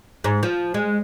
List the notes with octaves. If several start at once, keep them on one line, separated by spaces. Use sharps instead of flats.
G#2
F3
G#3